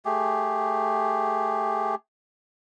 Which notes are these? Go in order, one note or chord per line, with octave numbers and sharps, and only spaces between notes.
A3 G4 G#4